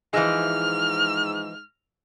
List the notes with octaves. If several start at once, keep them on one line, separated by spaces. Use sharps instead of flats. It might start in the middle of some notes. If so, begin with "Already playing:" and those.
G#2 E3 F3 G#3 F6